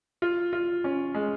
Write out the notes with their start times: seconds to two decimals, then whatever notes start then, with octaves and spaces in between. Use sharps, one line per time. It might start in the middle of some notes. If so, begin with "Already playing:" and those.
0.22 F4
0.53 F4
0.84 C#4
1.14 G#3